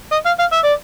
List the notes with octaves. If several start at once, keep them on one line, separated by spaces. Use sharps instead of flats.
D#5
F5
F5
E5
D5